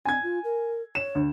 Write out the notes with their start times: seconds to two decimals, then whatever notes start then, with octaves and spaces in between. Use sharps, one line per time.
0.05 C4 G#5 G#6
0.23 F4
0.44 A#4
0.95 C#5 E7
1.15 D2